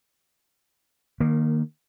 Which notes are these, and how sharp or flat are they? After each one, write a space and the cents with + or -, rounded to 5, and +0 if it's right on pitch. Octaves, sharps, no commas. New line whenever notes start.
D#3 -25 A#3 +0